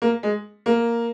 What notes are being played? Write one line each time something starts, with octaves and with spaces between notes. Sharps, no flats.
A#3
G#3
A#3